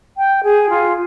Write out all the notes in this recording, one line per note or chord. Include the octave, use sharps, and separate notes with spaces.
G5
G#4
F4